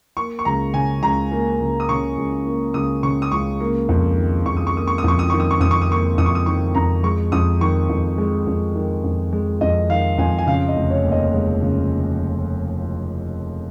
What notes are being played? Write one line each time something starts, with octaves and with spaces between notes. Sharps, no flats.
A#3 C#6
C#6
C#2 A#5
C#3 G#5
C#2 A#5
A#3
C#2
D#6
C#3 C#6
C#2
A#3
C#2 D#6
C#3 C#6
D#6
C#2 C#6
A#3
F2
D#3
F2 C#6
D#6
C#6
A#3 D#6
C#6
D#6
F2 C#6
D#6
D#3 C#6
D#6
C#6
F2 D#6
C#6
D#6
A#3 C#6
F2 D#6
C#6
D#6
D#3 C#6
F2 A#5
G#3 C#6
F2 D#6
D#3 C#6
F2
G#3
F2
D#3
F2
G#3
F2 D#5
D#3 F5
F2 G#5
G#5
C#3 F5
D#5
F1
C#5
D#2
D#5
G#3
C#3